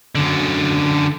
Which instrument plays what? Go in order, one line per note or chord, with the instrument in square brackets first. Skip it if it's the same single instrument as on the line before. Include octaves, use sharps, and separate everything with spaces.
[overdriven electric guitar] F#2 D3